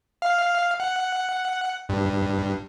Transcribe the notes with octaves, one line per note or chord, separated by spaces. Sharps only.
F5
F#5
G2